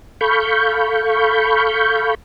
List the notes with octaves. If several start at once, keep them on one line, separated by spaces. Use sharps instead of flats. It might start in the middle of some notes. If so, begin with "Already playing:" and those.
A4 F5 B5 C#6 G6